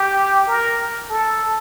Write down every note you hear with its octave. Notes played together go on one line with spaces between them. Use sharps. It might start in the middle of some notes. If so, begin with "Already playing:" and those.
Already playing: G4
A#4
A4